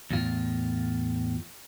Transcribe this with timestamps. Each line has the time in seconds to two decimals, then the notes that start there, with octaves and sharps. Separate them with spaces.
0.11 E2 A2 F4